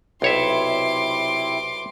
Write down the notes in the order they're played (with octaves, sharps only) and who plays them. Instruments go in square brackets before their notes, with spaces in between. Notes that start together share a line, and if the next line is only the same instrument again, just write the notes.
[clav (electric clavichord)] B1 C#5 E5 [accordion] C3 C4 E4 [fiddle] C6 D6